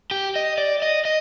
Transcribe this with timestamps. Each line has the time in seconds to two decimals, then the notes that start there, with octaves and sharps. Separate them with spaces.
0.11 G4
0.36 D#5
0.58 D5
0.82 D#5
1.05 D#5